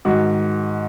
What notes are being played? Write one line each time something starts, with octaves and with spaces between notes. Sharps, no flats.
G#2 D#3 F#4